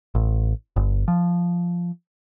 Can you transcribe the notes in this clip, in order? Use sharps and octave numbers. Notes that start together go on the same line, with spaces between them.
A1
G1
F3